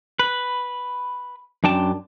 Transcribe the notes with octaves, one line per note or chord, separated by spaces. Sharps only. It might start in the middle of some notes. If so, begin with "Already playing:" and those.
B4
F#2 D4 G5 A5